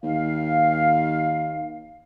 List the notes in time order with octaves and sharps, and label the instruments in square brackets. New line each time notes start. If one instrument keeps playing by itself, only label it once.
[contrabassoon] D#2 [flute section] F5